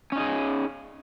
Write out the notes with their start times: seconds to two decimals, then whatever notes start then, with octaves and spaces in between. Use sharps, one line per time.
0.12 C#4
0.16 D#4
0.19 G#4